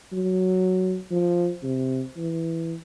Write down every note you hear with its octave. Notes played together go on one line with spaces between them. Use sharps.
F#3
F3
C3
E3